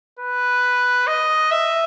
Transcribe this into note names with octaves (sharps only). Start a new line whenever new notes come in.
B4
D#5
E5